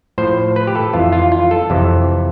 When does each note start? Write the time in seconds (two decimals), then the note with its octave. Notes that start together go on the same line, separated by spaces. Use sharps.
0.18 A2 F3 C5
0.56 B4
0.67 G4
0.75 A4
0.93 F2 E3 F4
1.12 F4
1.32 F4
1.51 A4
1.70 F2 C3 E3